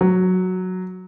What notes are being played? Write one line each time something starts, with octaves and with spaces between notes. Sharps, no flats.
F#3